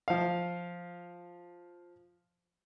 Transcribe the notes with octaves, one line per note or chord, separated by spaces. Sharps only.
F3 F5